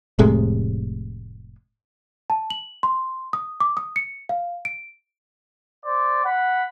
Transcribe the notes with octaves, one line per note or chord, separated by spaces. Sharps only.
F1 A2 C3 G#3
A5
F#7
C6
D#6
D6
D#6
C#7
F5
D7
C5 D5
F#5 B5